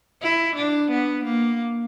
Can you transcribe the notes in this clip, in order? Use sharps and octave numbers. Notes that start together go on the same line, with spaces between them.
E4
D4
B3
A#3